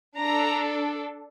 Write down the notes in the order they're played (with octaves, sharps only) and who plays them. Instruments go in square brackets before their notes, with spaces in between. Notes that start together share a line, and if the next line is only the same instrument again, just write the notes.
[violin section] D4 A4 A#5